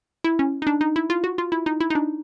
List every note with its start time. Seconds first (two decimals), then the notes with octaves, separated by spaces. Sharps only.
0.24 E4
0.39 C#4
0.62 D#4
0.67 D4
0.81 D#4
0.96 E4
1.10 F4
1.24 F#4
1.38 F4
1.52 E4
1.66 D#4
1.80 E4
1.90 D#4
1.95 D4